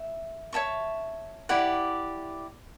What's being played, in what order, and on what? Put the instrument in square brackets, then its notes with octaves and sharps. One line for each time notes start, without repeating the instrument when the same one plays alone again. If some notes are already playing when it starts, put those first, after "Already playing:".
Already playing: [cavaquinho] E5
C#5 E5 A5 C#6
E4 G4 D5 F#5